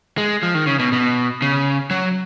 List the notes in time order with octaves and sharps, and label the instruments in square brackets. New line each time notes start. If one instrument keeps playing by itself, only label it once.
[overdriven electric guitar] G#3
F3
D#3
C#3
B2
B2
C#3
F#3